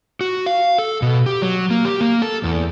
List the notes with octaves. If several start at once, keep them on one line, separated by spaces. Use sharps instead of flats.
F#4
F5
A4
B2
G4
F#3
A#3
G4
A#3
A4
E2